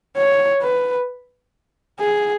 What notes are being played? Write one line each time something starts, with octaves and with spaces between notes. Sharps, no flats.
C#5
B4
G#4